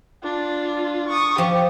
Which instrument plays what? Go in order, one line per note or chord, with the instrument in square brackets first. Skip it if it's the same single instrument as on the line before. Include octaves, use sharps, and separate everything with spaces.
[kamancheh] D4 F4
C#6 D#6
[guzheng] F3 [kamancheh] G4